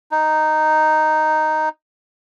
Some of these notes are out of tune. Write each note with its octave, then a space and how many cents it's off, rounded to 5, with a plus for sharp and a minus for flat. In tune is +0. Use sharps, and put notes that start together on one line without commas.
D#4 -5